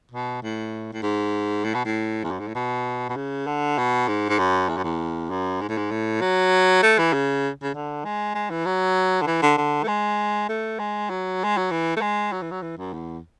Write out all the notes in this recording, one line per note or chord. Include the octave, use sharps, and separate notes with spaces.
B2
A2
A2
G#2
A2
B2
A2
E2
F#2
G#2
A2
B2
B2
C#3
D3
B2
G#2
G#2
F#2
E2
F#2
E2
F#2
G#2
A2
G#2
A2
F#3
A3
E3
C#3
C#3
D3
G#3
G#3
E3
F#3
D3
E3
D3
D3
A3
G#3
A3
G#3
F#3
G#3
F#3
E3
A3
G#3
F#3
E3
F#3
E3
F#2
E2